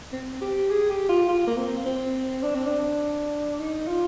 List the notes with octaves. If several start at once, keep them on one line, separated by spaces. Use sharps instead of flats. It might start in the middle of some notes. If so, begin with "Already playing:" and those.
C4
G4
G#4
G4
F4
F4
A#3
C4
C4
D4
C4
D4
D#4
F4